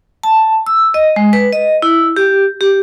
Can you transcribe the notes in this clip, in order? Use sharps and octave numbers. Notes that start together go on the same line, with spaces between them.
A5
E6
D#5
G#3
B4
D#5
E4
G4
G4